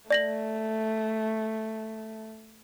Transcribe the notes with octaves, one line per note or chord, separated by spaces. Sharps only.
A3 D5 A#6 F#7